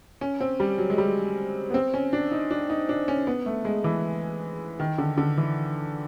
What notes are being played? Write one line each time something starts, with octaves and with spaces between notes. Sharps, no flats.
C#4
C4
G3
F#3
G#3
G3
B3
C4
C#4
D4
D#4
D4
D#4
D4
C#4
B3
A3
G#3
E3
D#3
D3
D3
E3